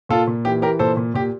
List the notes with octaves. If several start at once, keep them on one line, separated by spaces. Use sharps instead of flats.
A#2 F4 A4
A#2
E3 G4
E3 G4 A#4
A#2 A4 C5
A#2
A#2 G4